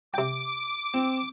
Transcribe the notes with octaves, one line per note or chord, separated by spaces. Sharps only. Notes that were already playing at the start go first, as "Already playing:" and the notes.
C3 G5 D6
C4